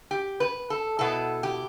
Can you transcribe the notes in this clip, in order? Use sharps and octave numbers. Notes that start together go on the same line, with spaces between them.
G4
B4
A4
B2 B3 E4 A4
G4